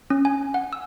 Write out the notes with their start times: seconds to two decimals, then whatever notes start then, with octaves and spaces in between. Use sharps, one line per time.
0.10 C#4
0.25 G#5
0.54 F#5
0.73 E6